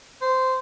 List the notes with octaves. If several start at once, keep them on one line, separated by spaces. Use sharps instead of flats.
C5